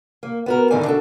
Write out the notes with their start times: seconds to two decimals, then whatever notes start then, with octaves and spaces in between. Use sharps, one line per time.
0.23 A#3
0.46 B3 F#4 A#4
0.71 D2 A2 D3 D#3 D5 G#5
0.84 D4 F#4 A4